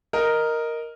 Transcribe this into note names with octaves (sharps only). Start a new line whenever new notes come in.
A#4 D#5